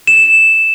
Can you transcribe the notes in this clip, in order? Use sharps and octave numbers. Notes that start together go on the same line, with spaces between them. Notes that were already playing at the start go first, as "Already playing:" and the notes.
E7